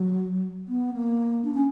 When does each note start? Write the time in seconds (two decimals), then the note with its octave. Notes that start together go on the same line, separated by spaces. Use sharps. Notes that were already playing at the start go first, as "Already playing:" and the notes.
Already playing: F#3
0.68 B3
0.94 A#3
1.44 D4
1.54 C#4